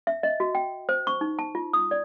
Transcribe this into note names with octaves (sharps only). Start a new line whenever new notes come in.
E5
D#5
F#4
G5
C5
C#6
D#4
A5
F4
D#6
D5